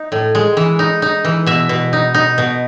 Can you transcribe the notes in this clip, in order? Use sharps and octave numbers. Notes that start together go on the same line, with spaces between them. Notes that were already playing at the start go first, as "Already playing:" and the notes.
Already playing: D#4
A2
G#3
E3
D#4
D#4
E3
B2 E5
B2
D#4
D#4
B2